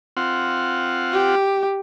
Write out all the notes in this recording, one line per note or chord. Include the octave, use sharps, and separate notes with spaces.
C4 F4 F#5
G4